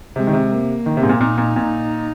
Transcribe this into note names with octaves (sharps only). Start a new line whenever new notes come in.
C3 G#3
D#3
C3
A#3
D#3
C3
G#2
A#2
A#2 D#4
A#2
A#2